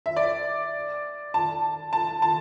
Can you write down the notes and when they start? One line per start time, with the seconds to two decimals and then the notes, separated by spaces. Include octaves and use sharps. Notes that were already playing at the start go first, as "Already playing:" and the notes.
0.06 E5
0.16 D5
1.34 A5
1.93 A5
2.22 A5